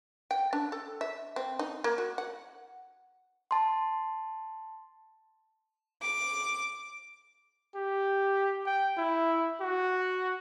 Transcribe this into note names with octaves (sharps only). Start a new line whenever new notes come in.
G5
D4
A4
E5
C4
D#4
A#3
F#4
F#5
A5 C6
D6
G4
G5
E4
F#4